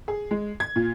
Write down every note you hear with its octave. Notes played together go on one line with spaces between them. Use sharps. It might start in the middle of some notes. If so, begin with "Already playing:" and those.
G#4
G#3
G#6
A#2